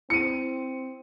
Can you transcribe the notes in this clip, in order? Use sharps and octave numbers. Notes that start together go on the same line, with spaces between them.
C4 E4 C#7 D#7